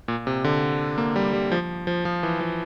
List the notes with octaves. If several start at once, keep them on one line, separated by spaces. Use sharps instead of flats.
A#2
C3
D3
A#3
G3
G3
F3
F3
F3
E3
F3